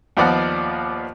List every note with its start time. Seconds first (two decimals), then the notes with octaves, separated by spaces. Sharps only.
0.17 D#2 F3 B3 D5 D#5 F#5